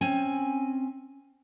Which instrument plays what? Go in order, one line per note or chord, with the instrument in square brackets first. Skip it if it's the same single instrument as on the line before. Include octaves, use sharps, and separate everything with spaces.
[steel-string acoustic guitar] C4 C#4 G#5